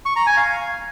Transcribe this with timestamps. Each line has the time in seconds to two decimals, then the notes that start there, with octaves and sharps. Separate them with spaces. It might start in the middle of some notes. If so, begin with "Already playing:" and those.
0.05 C#6
0.16 A#5
0.26 G#5
0.37 F5